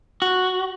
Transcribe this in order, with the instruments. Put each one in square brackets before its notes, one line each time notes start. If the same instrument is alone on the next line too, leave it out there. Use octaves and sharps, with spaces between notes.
[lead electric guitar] F#4